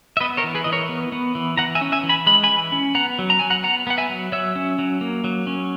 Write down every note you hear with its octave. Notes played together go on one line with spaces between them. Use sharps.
E5
B3 B4 D#5
A#4 C#5
E3
G#4 B4
E3 D#5
A#4 C#5
B3
B3
E3
E3 F#5 A#5
E5 G#5
C#4
E5 G#5
E3
G#5 B5
G#3 B5
G#5 B5
E3
C#4
B3 F#5 A#5
F#3
A#5
F#3 G#5
F#5 A#5
B3 F#5 A#5
B3 F#5
E5 G#5
F#3
F#3 C#5 E5
C#4
F#3
A#3
F#3
C#4